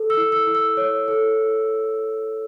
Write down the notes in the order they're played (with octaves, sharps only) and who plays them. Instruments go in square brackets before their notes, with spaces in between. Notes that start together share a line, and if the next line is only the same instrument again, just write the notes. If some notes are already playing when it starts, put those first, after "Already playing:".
Already playing: [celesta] A4
E6
E4
E6
E4
E6
C#5
A4